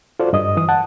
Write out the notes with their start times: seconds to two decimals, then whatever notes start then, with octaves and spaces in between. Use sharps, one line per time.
0.20 F4 F#4 A4 C5 D5
0.33 G2 D#5 D#6
0.57 E3 D#6
0.69 F#5 A5